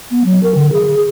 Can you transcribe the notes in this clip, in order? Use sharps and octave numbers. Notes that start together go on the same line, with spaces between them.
B3
F#3
A#4
D3
G#4
G#4